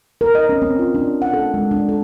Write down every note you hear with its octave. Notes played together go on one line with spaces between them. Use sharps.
A#4
D#5
C#4
C4
F4
D4
F#5
A4
G#3
D4
A4